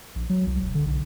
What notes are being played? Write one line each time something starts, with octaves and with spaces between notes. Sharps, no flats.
A#1
F#3
C2
E1
D3
B1